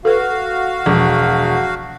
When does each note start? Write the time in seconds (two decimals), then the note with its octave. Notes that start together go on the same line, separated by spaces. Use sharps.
0.05 F#4 A4 B4 F5
0.86 E1 F3